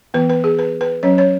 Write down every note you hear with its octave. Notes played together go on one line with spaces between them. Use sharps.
E3 B3 B4
B4
G#4
B4
B4
F#3 C#4 C#5
C#5